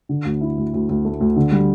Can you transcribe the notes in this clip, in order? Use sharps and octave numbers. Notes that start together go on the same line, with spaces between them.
D3
D2
E4
D2
D2
D2
A3
D2
D3
G3